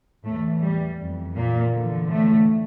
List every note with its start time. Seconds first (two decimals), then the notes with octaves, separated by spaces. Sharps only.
0.24 E2 A2 E3 A3
0.62 G3
0.98 F2 E3
1.36 A#2 A#3
1.72 E2 D3 F3
2.09 A2 A3